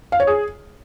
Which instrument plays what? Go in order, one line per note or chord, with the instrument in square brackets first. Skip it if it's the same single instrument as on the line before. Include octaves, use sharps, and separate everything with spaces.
[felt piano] F5
C#5
G#4